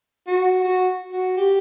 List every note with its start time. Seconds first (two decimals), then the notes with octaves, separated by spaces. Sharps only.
0.27 F#4
0.64 F#4
1.12 F#4
1.37 G4